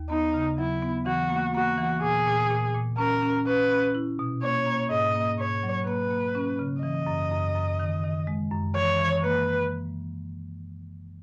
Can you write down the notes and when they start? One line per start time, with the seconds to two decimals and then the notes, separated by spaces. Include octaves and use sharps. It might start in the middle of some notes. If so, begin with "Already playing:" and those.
Already playing: D#2
0.10 B3 D#4
0.34 C#3
0.58 F#3 E4
0.82 B3
1.06 E3 F#4
1.30 A#3
1.54 A#3 F#4
1.78 E3
2.02 A#2 G#4
2.26 A#2
2.50 A#2
2.75 A#2
2.98 C#4 A#4
3.23 C#4
3.46 C#4 B4
3.71 C#4
3.95 E4
4.19 B2
4.43 A#3 C#5
4.66 A#3
4.90 G#2 D#5
5.15 A#3
5.39 G#2 C#5
5.63 F#3
5.86 A#3 B4
6.10 A#3
6.35 C#4
6.59 C#3
6.83 E3 D#5
7.06 F#2
7.32 F#2
7.55 F#2
7.79 D#3
8.04 D#3
8.27 G#3
8.51 F#2
8.75 E3 C#5
8.99 E3
9.23 A#3 B4